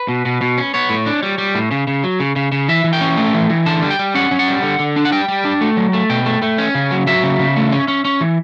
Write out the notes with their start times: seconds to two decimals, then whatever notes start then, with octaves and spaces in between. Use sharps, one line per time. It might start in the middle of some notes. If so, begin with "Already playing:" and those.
Already playing: B4
0.08 B2
0.25 B2
0.41 B2
0.58 C#4
0.74 B3 C#5
0.90 A2
1.06 D4
1.23 G3
1.38 G3
1.55 A2
1.71 C#3
1.87 C#3
2.04 F#3
2.20 C#3
2.36 C#3
2.52 C#3
2.68 E3 E5
2.84 E3
2.93 G5
3.01 C#4
3.17 A3
3.34 E3
3.50 E3
3.66 D3 A5
3.82 G3
3.90 G5
3.99 G3
4.15 C#4 F#5
4.31 C#4
4.39 F#5
4.48 G3
4.63 D3
4.79 D3
4.96 D4
5.05 F#5
5.12 G3 G5
5.28 G3
5.45 D4
5.61 A3
5.77 F#3
5.93 A3
6.10 B2 G5
6.26 A3
6.42 A3
6.58 C#4
6.75 C#3
6.91 F#3
7.07 F#3 E5
7.23 C#3
7.40 C#3
7.56 A3
7.72 C#4
7.88 C#4
8.05 C#4
8.21 E3